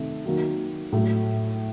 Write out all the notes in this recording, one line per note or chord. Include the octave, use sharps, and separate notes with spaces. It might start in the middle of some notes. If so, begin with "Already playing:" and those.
Already playing: C3 D#3 A3
D#3 F#3 A#3 F#4
A2 F#3 A3